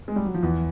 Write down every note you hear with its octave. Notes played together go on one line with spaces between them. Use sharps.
G#3
G3
F#3
F3
E2 E3